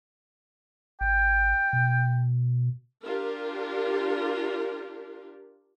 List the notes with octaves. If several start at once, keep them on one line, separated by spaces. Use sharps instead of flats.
G#1 G5
B2
D4 F4 G4 A#4